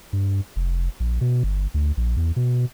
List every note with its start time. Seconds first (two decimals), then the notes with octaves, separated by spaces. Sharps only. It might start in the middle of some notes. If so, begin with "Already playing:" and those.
0.13 G2
0.56 F1
1.00 A#1
1.21 B2
1.43 G1
1.74 D2
1.97 A#1
2.16 E2
2.36 B2